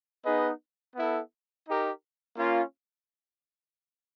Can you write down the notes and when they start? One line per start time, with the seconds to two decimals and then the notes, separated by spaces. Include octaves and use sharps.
0.26 B3 D#4 G#4 B4 D#5
0.96 B3 E4 A4
1.67 D#4 G4 A#4
2.37 A#3 C#4 F4